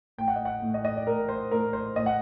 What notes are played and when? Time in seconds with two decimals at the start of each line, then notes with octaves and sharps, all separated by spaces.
0.18 A2 G5
0.28 F#5
0.36 D#5
0.45 F#5
0.62 A2
0.74 D#5
0.85 D#5
0.96 D5
1.07 A2 A#4
1.29 C5
1.51 A2 A#4
1.73 C5
1.96 A2 D#5
2.06 F#5